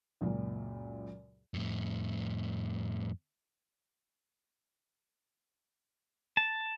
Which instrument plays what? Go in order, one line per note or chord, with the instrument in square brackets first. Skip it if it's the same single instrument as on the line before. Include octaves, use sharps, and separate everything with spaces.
[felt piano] C#2 F#2 A#2
[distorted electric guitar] F2 A2
[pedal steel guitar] A5